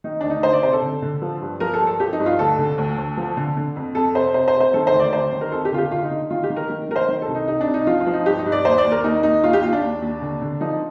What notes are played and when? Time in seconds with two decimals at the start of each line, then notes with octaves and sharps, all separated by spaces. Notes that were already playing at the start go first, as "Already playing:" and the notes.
0.04 D#3 D#4
0.21 D2 D4
0.30 D#4
0.43 D2 C5
0.53 D5
0.63 C3 C5
0.73 A4
0.82 D3
1.02 D3
1.22 F3
1.42 G2
1.60 F3 A#4
1.74 A4
1.80 G2
1.87 A4
2.00 F3 G4
2.13 D#4
2.20 G2
2.26 F4
2.39 D2 A4
2.59 D3
2.78 D2
2.98 D2
3.17 F3
3.37 D3
3.56 D3
3.76 F2
3.95 F2 A4
4.15 C3 C5
4.34 C3 C5
4.48 C5
4.54 C3
4.60 C5
4.74 D#3 A4
4.87 C5
4.93 D2
4.99 D5
5.13 D2 C5
5.32 D#3
5.41 A#4
5.52 F2 A4
5.65 G4
5.72 D3 F4
5.78 G4
5.91 D3 F4
6.04 D#4
6.11 D3
6.30 D#3 F4
6.43 G4
6.50 D#3
6.56 A#4
6.69 D#3
6.89 D#3 A#4
6.96 C5
7.09 D#3
7.22 A4
7.28 C2
7.35 D#4
7.48 C3 D#4
7.61 D4
7.67 C2
7.74 D#4
7.87 F3 F4
8.00 F4
8.06 F3
8.13 D#4
8.26 G2 G4
8.39 D#4
8.45 G2
8.52 D5
8.65 D#2 C5
8.78 D5
8.84 D#2
8.91 A#4
9.04 D#2 D#4
9.23 D#2 D#4
9.43 D#2 F4
9.53 G4
9.63 D#2 F4
9.72 D4
9.82 D#2
10.02 D#2
10.22 D3
10.41 D3
10.61 F3 D#4